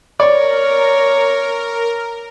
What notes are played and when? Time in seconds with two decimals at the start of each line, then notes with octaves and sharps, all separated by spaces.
0.20 A#4 C#5 D5